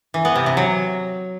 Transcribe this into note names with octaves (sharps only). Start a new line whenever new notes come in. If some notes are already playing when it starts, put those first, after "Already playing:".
E3
B3
C3
C3
F#3